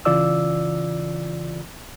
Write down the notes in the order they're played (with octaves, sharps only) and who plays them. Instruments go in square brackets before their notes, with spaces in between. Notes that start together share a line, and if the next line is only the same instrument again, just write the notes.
[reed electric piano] C#3 E3 F4 D5 E6